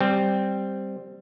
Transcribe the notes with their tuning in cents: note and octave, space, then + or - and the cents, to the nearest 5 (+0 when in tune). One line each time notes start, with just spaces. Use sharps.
G3 +0 C4 +0